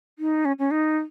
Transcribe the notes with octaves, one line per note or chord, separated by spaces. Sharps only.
D#4
C#4
C#4
D#4